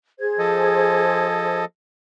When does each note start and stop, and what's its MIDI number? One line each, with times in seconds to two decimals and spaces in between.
0.19 1.59 68
0.19 1.59 72
0.19 1.59 92
0.39 1.65 53
0.39 1.65 69
0.39 1.65 75